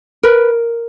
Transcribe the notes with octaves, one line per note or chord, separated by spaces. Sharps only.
A#4 B4